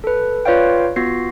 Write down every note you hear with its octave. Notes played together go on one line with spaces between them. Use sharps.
A4 B4
F4 B4 C#5 D5 F5 G5
B3 F4 F#4 A#6 C7